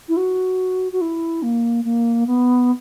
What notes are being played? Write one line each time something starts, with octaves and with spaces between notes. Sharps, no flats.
E4
F#4
F#4
E4
A#3
A#3
B3